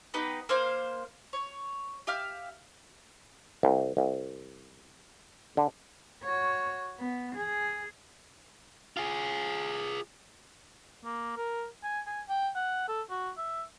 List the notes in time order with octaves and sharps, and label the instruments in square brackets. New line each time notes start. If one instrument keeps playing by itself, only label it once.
[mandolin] B3 D#4 G4 B4
A#3 C5 F5
C#5
G4 E5 F5 F6
[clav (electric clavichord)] C2
C2
D3
[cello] F#4 C#5
B3
G#4
[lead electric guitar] F4 G#4
[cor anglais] A#3
A#4
G#5
G#5
G5
F#5
A4
F#4
E5